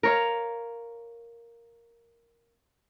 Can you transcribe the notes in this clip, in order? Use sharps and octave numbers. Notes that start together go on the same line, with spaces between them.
A#4 C#5 F5